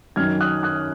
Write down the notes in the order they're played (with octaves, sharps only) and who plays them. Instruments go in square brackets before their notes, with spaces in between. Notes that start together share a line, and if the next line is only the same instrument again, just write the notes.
[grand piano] F#2 D#3 F6 G#6
D#6 F#6
D#6 F#6